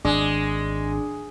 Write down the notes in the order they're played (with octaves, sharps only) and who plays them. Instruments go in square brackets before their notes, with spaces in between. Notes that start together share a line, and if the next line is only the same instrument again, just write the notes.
[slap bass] G#1 [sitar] G#3 [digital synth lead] D4